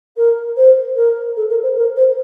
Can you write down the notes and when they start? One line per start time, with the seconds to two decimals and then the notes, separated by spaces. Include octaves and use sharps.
0.16 A#4
0.56 C5
0.95 A#4
1.36 A4
1.49 A#4
1.62 C5
1.76 A#4
1.96 C5